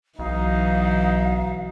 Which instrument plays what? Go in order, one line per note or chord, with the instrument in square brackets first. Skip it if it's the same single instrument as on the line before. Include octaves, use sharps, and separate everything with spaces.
[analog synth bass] B1 [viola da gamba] E3 F#3 [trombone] D#4 [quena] F5